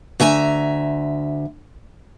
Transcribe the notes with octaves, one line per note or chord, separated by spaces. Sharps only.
D2 E5 G#5 A#5